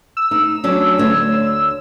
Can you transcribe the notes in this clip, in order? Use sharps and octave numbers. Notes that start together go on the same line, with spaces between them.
E6
D#4
F#3 C#4 D4
D2 C#5